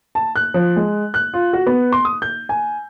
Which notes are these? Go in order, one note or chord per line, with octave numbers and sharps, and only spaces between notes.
A5
F#6
F3
G#3
F#6
F4
F#4
B3
C6
D#6
G6
G#5